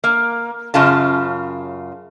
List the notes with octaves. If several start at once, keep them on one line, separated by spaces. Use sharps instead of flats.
A#3
F#2 C#3 F4 A5